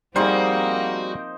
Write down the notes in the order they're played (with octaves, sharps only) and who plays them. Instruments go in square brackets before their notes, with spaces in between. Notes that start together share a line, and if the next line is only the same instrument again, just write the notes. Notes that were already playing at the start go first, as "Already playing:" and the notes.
[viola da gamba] F3 A#3 C4 [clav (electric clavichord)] G3 G#4 [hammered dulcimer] D#4 C5 [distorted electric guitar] F#4